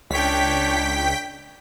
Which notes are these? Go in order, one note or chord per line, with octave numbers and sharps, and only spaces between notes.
C#2 D4 C#5 G5 B6